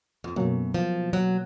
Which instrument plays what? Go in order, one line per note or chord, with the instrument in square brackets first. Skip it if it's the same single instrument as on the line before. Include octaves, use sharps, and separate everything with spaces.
[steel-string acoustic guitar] F2
[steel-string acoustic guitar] F#2 [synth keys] B2 F#3 A#3
[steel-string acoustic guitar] F3
F#3